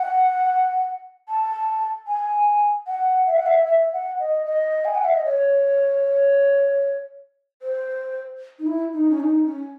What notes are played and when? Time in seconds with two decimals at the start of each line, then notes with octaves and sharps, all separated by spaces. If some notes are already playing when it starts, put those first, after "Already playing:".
Already playing: F#5
1.29 A5
2.08 G#5
2.87 F#5
3.27 E5
3.37 F#5
3.46 E5
3.66 E5
3.93 F#5
4.19 D#5
4.45 D#5
4.85 G#5
4.95 F#5
5.04 E5
5.15 D#5
5.24 C#5
7.62 C5
8.59 D#4
8.67 E4
8.93 D#4
9.10 C#4
9.20 D#4
9.45 C#4